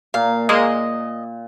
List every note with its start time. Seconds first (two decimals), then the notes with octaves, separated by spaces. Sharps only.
0.14 A#2 F5
0.49 G#3 A#3 D#5